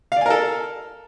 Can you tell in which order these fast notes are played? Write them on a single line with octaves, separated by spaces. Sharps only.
F5 D5 G#5 A#4 A4